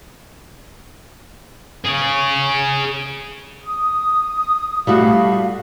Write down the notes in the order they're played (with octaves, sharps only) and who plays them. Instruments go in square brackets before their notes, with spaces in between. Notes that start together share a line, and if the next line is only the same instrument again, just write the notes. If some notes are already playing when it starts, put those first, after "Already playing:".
[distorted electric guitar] G#4 C#5
[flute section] D#6
[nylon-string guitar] G3 A3 F#4 [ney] F5